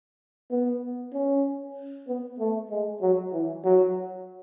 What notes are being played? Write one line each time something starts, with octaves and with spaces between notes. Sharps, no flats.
B3
C#4
B3
A3
G#3
F#3
E3
F#3